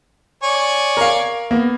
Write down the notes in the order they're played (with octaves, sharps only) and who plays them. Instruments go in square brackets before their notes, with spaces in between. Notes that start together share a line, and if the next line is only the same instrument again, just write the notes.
[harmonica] C#5 D5 G#5
[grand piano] A#4 F5
A#3 B3